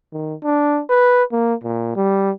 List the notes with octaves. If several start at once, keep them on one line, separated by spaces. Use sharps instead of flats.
D#3
D4
B4
A#3
A#2
G3